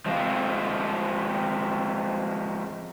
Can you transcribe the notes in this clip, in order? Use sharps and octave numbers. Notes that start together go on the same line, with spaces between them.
F3 G#3 C4 F5